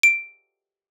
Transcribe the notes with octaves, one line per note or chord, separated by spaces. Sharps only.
D7